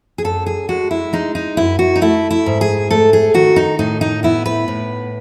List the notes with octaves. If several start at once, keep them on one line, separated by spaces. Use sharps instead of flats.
G#4
F#2 A4
G#4
G#3 F#4
E4
G#3 D#4
D#4
F#2 E4
F#4
D#4
A3 E4
E4
G#2
G#4
A3 A4
G#4
D#3 F#4
D#4
A2 D#4
D#4
B3 E4
B4
A2